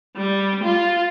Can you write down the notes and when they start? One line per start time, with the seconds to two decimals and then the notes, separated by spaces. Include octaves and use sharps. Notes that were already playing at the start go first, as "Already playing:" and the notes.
0.17 G3
0.64 F4